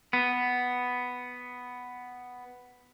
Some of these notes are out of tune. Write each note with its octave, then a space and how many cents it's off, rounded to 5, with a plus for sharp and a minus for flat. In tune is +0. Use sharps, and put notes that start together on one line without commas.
B3 +5